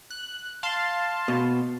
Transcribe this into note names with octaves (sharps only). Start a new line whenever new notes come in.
F#6
F5 A5 C6
B2